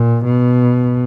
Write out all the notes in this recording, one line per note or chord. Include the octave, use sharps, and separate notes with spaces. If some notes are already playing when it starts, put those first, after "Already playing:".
Already playing: A#2
B2